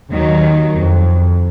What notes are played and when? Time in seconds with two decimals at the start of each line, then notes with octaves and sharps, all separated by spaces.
0.11 D#2 D#3 F#3
0.79 F2